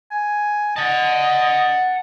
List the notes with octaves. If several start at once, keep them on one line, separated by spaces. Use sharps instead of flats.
G#5
D#5 F#5 A5